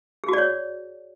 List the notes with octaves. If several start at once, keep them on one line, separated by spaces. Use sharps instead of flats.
F#4 G#4 C#5 D5